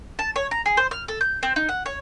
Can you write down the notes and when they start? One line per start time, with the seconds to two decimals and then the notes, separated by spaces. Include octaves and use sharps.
0.19 A5
0.36 C#5
0.51 A#5
0.66 G#4
0.77 C5
0.91 F6
1.08 A4
1.21 G6
1.43 C4
1.56 D#4
1.69 F#5
1.86 C#5